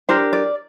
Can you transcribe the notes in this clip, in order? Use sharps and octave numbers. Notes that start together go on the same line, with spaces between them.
D4 G4 A#4 C5
D5